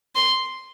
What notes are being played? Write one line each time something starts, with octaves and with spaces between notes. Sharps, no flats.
C6